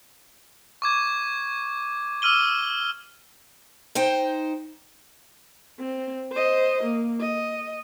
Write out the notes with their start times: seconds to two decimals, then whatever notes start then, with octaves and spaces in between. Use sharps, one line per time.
0.82 C#6 D6 G#6
2.22 D6 E6 F6 D#7 G7
3.95 D#4 C5 G5
5.80 C4
6.32 C5 D#5
6.83 A#3
7.21 D#5